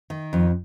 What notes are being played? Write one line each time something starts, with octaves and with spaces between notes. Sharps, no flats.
D#3
F2